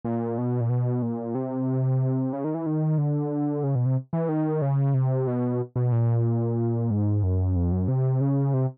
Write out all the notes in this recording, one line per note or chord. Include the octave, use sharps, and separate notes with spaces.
A#2
B2
A#2
B2
A#2
C3
C#3
D#3
E3
D#3
D3
C#3
B2
C3
E3
D#3
C#3
C3
B2
B2
A#2
G#2
F#2
F2
F#2
C3
C#3
C3